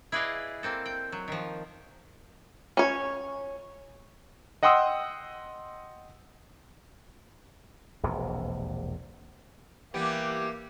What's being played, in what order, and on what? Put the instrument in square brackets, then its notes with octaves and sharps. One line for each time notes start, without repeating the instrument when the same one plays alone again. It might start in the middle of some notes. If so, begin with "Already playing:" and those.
[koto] E4 G#4 B4 D5 D#5 F5
A#3 C4 A4
G5
F#3
D#3 F3
[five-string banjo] C#4 C#5
[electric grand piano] D#5 F#5 G5 C6 D#6 E6
[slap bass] E1 A#1 D#2 C3
[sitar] E3 G3 B3 [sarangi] A#3 [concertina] G4 G5 [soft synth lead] D6